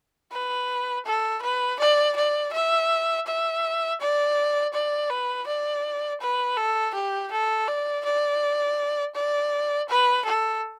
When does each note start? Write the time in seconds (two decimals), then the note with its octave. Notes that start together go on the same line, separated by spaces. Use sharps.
0.32 B4
1.05 A4
1.42 B4
1.79 D5
2.16 D5
2.53 E5
3.27 E5
4.00 D5
4.73 D5
5.10 B4
5.47 D5
6.21 B4
6.57 A4
6.95 G4
7.31 A4
7.68 D5
8.05 D5
9.15 D5
9.89 B4
10.25 A4